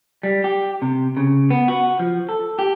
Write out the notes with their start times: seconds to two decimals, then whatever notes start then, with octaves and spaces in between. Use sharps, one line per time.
0.23 G3
0.44 G4
0.82 C3
1.17 C#3
1.50 B3
1.68 F#4
1.99 F3
2.29 A4
2.59 G4